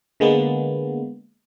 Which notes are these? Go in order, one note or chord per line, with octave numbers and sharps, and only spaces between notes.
D3 G#3 A#3 B3